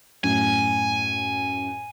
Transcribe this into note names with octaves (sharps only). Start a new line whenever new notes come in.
F#2 A2 G#5